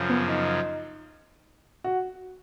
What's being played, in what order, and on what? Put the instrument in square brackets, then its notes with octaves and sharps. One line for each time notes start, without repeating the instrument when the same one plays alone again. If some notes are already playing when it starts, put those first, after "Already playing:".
Already playing: [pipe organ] F#2 C#3 F3
[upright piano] B3
D#4
F#4